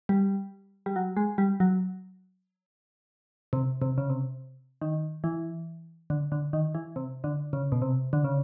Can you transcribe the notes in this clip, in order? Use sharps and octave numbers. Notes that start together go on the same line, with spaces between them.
G3
G3
F#3
G#3
G3
F#3
C3
C3
C#3
C3
D#3
E3
D3
D3
D#3
E3
C3
D3
C#3
B2
C3
D3
C#3